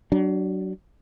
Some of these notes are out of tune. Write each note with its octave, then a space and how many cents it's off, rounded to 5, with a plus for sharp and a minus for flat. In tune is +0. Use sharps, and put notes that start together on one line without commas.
F#3 +30 D4 +0